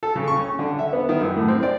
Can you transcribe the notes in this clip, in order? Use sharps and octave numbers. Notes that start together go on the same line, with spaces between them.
A4
C#3
C#6
C#4
D3
E5
B3
D#3
F#2
A2
C4
D5